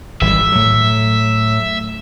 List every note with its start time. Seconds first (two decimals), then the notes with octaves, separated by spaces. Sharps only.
0.21 G#1 E3 G3 E5
0.52 A2 F#3